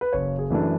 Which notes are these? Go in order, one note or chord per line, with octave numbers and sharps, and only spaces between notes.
B4
F#1 C#5
G#4
F#2 E3 A3 D4